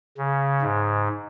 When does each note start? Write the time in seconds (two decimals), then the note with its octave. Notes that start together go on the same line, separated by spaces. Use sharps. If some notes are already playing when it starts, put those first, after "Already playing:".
0.17 C#3
0.62 G#2